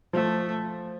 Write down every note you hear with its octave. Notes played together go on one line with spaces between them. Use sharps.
F3 A3